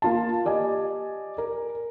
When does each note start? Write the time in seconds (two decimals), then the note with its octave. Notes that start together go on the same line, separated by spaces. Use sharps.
0.02 A#3 F4 A5
0.45 G4 D5 D#5 G#5
1.38 A#4